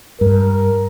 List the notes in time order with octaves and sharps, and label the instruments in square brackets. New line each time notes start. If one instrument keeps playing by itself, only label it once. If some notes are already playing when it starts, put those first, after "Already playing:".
[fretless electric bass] G2 [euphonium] A#4